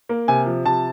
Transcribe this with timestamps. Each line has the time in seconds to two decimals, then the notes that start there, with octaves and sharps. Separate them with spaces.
0.09 A#3
0.28 C3 G#5
0.46 F3
0.66 C3 A5